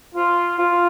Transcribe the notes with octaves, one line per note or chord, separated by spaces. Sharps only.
F4
F4